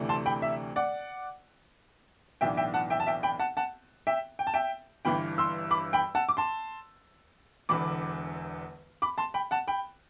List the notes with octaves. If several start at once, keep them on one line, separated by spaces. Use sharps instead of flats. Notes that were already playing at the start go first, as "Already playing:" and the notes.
Already playing: D2 C3 E3 A3 D4
A5 C6
G5 B5
E5
D5 F#5
B1 A2 E3 B3 D4 E5 G5
E5 G5
F#5 A5
E5 G5
A5
E5 G5
G5 B5
F#5 A5
F#5 A5
E5 G5
G5
A5
E5 G5
G1 G2 E3 G5 B5
C6 E6
B5 D6
G5 B5
F#5 A5
D6
A5 C6
E1 E2 D3 B5 D6
B5 D6
A5 C6
G5 B5
F#5 A5
G5 B5